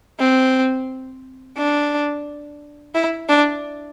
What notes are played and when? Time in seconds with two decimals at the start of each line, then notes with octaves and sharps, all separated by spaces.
0.20 C4
1.57 D4
2.95 E4
3.29 D4